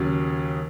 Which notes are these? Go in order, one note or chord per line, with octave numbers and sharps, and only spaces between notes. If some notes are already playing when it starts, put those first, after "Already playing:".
Already playing: D#2 C#3 F#3